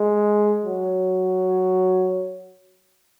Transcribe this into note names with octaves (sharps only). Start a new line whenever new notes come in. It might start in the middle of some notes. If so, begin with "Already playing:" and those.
Already playing: G#3
F#3